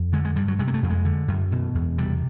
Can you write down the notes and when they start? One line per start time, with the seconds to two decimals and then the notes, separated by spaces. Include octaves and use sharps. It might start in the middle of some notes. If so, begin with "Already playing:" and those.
Already playing: F2
0.13 D3 G#3
0.25 G#3
0.36 G2 G3
0.48 F#3
0.59 C3 G#3
0.68 A#3
0.74 A3
0.83 F2
0.90 G#3
1.05 D3
1.28 F#2
1.52 B2
1.75 E2
1.98 C3 G3